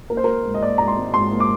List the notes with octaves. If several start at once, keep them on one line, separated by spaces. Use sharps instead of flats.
A#3 A#4
C5
A#3 A#4
G#2
D#5
A#3 D5
G#2 A#5
C6
G#1
G#2 C6
A#3
D6